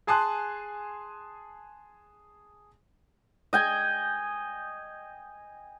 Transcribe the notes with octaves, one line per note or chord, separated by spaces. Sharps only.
G#4 G#5 A5 C6 D#6 F#6
D#5 G5 G#5